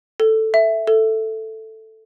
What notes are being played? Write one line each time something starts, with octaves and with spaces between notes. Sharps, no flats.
A4
E5
A4